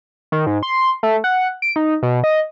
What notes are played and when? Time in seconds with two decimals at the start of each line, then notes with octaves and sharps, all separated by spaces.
0.32 D#3
0.47 G#2
0.63 C6
1.03 A3
1.24 F#5
1.62 D7
1.76 D#4
2.03 B2
2.24 D#5